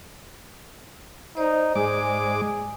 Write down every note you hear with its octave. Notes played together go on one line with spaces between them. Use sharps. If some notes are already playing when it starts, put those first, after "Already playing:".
D#4 C5 D5
G#2 G#3 G#4 D6